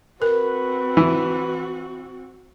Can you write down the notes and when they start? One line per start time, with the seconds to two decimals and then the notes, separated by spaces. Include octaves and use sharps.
0.22 C4 F#4 A#4 B4
0.97 E3